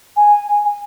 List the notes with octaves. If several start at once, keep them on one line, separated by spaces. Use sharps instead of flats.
G#5